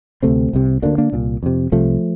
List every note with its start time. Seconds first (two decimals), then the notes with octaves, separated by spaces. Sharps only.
0.23 D2 C3 A3 C4
0.53 C2 C3
0.82 D2 D3 A#3 D4
0.98 A#3 D4
1.12 C2 A#2
1.43 F2 C3
1.72 C2 C3 F3 A3